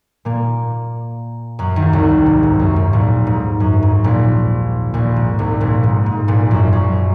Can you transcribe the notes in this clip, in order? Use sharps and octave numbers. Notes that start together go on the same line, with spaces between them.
A#2 A#3
F#2 F#3
D#2 D#3
C2 C3
G#2
G#2
F#2
G#2
A#1 A#2
G#2
F#2
G#2
A#1 A#2
A#1 A#2
G#2
C2 C3
A#1 A#2
G#2
G#2
A#1 A#2
F#2
F#2